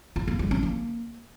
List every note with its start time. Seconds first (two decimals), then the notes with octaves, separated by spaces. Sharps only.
0.16 F4
0.28 A#3
0.39 G3
0.51 C#4
0.63 A#3